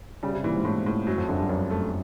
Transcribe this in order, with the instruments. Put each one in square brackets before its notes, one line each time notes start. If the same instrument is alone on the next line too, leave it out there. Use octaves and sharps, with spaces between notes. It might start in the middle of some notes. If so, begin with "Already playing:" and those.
[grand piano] C#3 [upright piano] G3
[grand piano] C3
[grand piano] A#2 [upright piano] E3
[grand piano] G#2
[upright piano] A2
A2
[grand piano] F#2 [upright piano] F#3
[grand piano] F2
[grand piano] F#2 [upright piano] D3
[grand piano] G2
[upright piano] F#2
A3